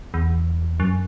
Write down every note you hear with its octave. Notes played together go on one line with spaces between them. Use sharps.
E2
F#2